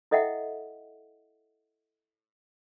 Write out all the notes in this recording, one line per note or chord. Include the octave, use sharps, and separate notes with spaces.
E4 A4 D#5 E5 F#5 G5